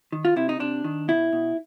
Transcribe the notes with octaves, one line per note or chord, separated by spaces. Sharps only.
D#3
F4
C3 E4
D#4
C3 D4
D#3
B2 E4
B2